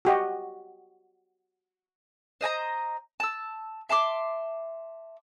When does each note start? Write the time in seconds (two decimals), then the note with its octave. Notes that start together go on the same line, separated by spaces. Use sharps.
0.05 F#4 G4 D#5
2.41 C5 D#5 G#5 A#5
3.20 A5 E6
3.89 E5 A5 C6 D6